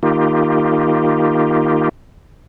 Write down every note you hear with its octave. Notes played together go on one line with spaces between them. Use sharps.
D#3 A#3 D#4 F4 G4